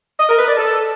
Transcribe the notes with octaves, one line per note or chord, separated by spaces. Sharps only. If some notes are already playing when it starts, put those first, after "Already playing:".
D#5
A#4
B4
D5
A4